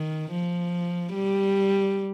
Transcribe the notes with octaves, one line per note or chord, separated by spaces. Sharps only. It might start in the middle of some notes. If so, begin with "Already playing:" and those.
Already playing: D#3
F3
G3